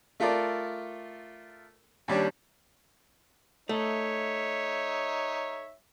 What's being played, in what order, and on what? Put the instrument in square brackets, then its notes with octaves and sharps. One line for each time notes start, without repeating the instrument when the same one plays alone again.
[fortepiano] A3 F4 A4 A#4 D5
D#2 G3 C#4 D4
[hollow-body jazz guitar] A3 [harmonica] D#4 C#5 E5